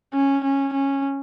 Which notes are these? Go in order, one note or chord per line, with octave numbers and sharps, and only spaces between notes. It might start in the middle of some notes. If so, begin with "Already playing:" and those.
C#4
C#4
C#4